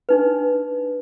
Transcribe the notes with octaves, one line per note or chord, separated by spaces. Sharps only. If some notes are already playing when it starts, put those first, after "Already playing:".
D4 D#4 B4